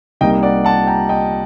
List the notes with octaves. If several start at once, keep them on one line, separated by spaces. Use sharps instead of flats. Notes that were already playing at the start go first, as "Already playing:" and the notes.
C2 C3 G3 A#3 D#4 D#5 G5
D5 F#5
F#5 A5
G5 A#5
D#5 G5